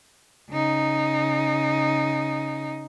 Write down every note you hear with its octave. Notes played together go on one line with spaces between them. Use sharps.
C#3 D#4